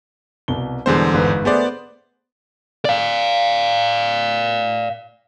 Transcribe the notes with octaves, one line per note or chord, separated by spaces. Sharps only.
C2 B2 G7
E2 B2 D3 G3 G#3 C5
G1 G#2 B4
A3 B3 G#4 B4 C5 D5
D5 F5